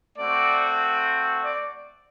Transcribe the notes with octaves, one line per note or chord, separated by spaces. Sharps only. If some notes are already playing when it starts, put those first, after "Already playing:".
A3 C4 F#4 D5
D5